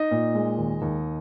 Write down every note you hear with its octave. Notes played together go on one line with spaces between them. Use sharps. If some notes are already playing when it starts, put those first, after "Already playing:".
Already playing: D#4 D#5
A#2
G#3
D#2
D#2